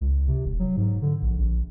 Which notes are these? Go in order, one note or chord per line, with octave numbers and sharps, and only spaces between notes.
C#2
C3
E1
F#3
G#2
D3
A#1
A#1